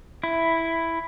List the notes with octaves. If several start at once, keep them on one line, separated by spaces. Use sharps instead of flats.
E4